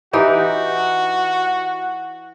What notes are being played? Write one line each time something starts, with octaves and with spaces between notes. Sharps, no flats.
E3 D#4 F#4 G4